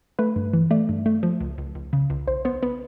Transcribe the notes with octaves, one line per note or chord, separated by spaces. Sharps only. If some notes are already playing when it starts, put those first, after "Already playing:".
A3 B4
G2
E3
A3 D5
G2
A3
F3
C#2
C#2
C#2
C#3
C#2
B1 C5
B3 C5
B3 B4